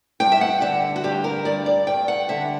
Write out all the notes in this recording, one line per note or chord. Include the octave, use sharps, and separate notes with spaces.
G2 G5
E5
F#5
D3 E5
F#4
G2 G4
A#4
G2 D5
D5
G2 G5
F#5
D3 E5